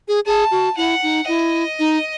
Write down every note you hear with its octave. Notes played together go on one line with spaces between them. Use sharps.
G#4
G#4 A5
F#4
E4 F#5
D#4
E4 D#5
D#4